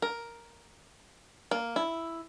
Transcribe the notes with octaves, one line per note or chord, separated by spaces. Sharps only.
A#4
A#3
E4